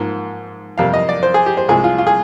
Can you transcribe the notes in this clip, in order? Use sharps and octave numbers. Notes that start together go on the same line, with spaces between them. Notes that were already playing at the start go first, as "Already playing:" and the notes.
Already playing: G#2 F3 A#3
F2 C3 G3 A#3 F5
D#5
D5
C5
G#4
G4
C5
C2 C3 F3 G#3 G#4
F4
F4
G#4